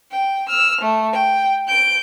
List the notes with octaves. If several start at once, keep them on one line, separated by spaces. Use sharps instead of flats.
G5
E6 F6
A3
G5
G6 D7